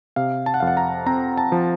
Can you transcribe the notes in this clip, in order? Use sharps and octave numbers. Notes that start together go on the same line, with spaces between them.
C3 F5
A5
F#5
F2 F5
F#5
A#5
C4 A#5
A5
F3